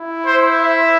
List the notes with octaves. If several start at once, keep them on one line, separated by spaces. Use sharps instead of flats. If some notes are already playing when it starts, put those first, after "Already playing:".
Already playing: E4
C5
E5